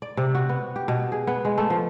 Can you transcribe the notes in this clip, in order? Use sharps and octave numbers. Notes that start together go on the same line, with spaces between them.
D5
C3
F#4
B3
G4
B2
G#4
B3
G#3
A3
F3